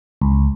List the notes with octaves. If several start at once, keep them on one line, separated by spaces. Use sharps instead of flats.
C#2